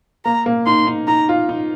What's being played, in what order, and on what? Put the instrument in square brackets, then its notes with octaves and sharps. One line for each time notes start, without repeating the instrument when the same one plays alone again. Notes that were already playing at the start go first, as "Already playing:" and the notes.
[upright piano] A#3 [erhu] A#5
[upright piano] A#3
[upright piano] D#4 [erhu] C6
[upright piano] D#4
[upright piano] D#4 [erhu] A#5
[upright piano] F4
D#4